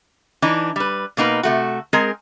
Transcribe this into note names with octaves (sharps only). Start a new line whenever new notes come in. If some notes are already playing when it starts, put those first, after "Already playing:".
E3 D4 D#4
G3 B4
B2 A#3 D#4 B4
C3 A3 F#4
G#3 C4 G#4 A#4